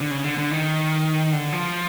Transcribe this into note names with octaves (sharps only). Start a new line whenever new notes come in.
D3
C#3
D3
D3
D#3
D3
F3